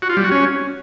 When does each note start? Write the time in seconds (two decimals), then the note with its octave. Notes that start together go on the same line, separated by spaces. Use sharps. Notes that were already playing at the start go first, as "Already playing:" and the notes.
0.02 F#4
0.10 F4
0.17 G3
0.24 F#4
0.31 C#4